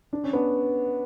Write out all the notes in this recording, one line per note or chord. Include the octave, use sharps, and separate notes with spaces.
D4
C#4
B3 D4